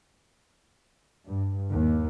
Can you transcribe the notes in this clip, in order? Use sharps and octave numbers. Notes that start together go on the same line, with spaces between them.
G2
D#2